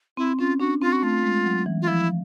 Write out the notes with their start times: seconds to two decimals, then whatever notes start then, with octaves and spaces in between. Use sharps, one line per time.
0.17 C4 E4
0.39 C#4 F4
0.59 D4 F#4
0.81 C4 F4
0.93 F#4
1.03 A3 F4
1.24 G#3
1.45 F#3
1.66 E3
1.82 F4
1.88 F3 E4